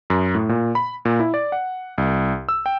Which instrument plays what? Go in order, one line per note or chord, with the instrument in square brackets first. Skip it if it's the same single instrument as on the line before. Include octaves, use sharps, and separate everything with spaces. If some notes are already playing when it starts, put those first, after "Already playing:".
[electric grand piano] F#2
A2
A#2
B5
A#2
E4
D5
F#5
C2
E6
G5